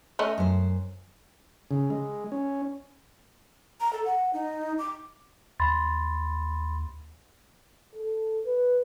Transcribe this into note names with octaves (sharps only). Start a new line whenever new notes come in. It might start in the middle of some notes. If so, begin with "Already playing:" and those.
A3 C#4 D#5
F#2 C5
C#3
G#3
C#4
A#5
A4
F#5
D#4
D6
D#2 B5 C6 A6
A4
B4